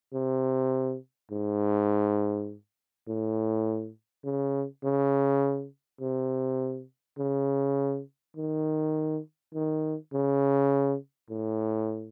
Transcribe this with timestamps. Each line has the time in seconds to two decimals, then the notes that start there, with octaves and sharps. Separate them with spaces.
0.14 C3
1.31 G#2
3.08 A2
4.25 C#3
4.84 C#3
6.01 C3
7.19 C#3
8.37 D#3
9.54 D#3
10.13 C#3
11.30 A2